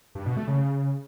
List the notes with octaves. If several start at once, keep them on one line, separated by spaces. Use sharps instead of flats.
G2
B2
A3
C#3